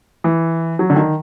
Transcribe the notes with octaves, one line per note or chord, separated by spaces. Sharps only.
E3
F#3
D3
D#3